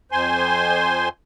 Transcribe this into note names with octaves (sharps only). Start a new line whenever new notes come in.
F2 C5 G#5 C6